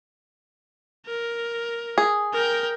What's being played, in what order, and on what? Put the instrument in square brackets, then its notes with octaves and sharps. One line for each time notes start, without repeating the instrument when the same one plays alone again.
[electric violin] A#4
[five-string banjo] G#4
[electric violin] A#4 G5